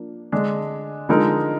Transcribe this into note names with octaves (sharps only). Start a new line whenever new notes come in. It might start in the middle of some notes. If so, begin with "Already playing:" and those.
Already playing: F3 A#3 D4
D3 G#3 D4
D3 F3 G#3 D#4 A#4